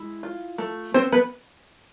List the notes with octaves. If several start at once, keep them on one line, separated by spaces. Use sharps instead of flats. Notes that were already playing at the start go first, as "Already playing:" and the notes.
Already playing: G#3 E4
F4
A3
B3 C4 C5
B3 B4